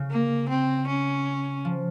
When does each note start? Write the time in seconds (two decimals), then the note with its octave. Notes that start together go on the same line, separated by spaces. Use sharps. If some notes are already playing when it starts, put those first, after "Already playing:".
Already playing: C#3
0.11 A#3
0.49 C4
0.88 C#4
1.65 F3